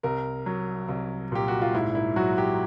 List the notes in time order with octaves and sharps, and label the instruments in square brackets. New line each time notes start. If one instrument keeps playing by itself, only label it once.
[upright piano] C2 A#4
F#3
C2
A#2 G4
F#4
F4
G#2 E4
E4
F#3 F#4
G4